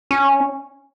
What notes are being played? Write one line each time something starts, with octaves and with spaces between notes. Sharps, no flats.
C#4